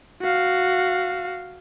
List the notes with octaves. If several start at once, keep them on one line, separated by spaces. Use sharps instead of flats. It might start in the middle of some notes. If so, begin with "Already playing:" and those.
F#4 F5